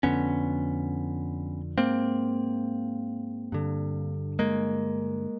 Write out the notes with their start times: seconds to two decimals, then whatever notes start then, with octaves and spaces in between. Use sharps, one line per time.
0.03 F2 D3 B3 C#4
1.78 G#2 A#3 C4
3.52 G2 D3
4.39 G#3 A#3